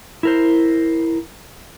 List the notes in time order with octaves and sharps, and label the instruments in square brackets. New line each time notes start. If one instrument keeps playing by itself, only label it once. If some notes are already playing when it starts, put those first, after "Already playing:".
[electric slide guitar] E4 A#4 C5